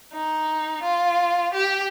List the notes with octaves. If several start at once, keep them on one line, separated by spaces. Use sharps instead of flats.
D#4
F4
G4